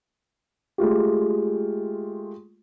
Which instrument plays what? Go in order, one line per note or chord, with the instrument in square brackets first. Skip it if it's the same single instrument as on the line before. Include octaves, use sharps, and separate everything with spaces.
[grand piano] G#3 A3 F4 G4